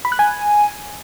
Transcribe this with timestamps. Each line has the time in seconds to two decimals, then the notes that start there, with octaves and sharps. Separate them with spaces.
0.05 B5
0.12 F#6
0.19 G#5